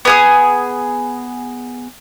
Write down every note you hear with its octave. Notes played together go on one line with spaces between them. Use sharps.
B3 G#4 D#6